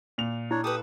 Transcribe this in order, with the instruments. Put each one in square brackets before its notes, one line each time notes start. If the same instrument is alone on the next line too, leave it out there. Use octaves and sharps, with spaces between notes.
[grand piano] A#2 F7
[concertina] D4 C#5 [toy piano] E4
[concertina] G4 D#6 [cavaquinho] A4 B4